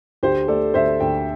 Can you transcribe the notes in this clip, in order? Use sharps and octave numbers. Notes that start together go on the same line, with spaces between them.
D2 G4 C5
A3 A4 D5
D2 C5 E5
D2 G5